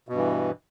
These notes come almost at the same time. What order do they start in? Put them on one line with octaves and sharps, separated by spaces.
B2 G2 E3